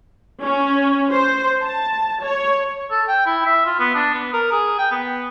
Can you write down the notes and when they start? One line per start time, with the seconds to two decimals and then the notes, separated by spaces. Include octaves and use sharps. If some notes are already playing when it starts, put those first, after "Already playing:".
0.43 C#4
1.11 C5
1.62 A5
2.23 C#5
2.91 A4
3.08 G5
3.26 E4
3.45 E5
3.66 F4
3.79 B3
3.95 D4
4.14 B3
4.33 A#4
4.52 G#4
4.79 G5
4.91 B3